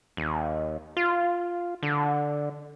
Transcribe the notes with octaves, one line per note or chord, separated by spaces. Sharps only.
D#2
F4
D3